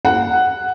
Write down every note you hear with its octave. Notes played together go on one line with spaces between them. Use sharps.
F#5